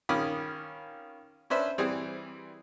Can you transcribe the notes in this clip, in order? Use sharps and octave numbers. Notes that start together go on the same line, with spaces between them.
D#3 C#4 F4 B5 D6 D#6
C#4 D4 B4 C5 E5
E3 G3 C4 G#4